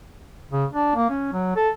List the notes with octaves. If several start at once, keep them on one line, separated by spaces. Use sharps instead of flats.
C#3
D4
A#3
C#4
F#3
A4